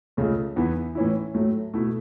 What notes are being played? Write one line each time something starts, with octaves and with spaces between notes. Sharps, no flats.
C#2 C#3 A3
E2 E3 B3 E4
A2 E3 C#4 E4
A2 F#3 A3
B2 A3 E4